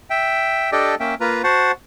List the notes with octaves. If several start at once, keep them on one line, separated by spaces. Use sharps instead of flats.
E5 G5
D4 G4 A4 D5 D#5 G5
A#3 C#4 E5 G5
A#3 F4 B4 A#5
F#4 C5 F#5 A5